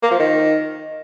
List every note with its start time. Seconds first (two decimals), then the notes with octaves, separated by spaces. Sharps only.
0.03 A#3
0.11 F3
0.20 D#3